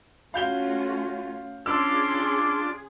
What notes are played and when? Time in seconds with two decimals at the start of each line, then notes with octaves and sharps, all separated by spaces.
0.34 A3 C#4 F4 F#4 F5 G6 G7
1.66 C#4 D4 F4 G#4 C6 D6 E6